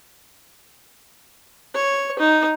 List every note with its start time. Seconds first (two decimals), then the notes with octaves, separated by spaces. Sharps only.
1.75 C#5
2.19 D#4